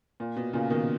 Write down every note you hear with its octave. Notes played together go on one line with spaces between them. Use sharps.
A#2
B2
A#2 C#3
B2 D#3